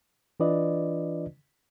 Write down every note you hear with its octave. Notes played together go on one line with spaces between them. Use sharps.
E3 D4 F4 B4 D5 D#5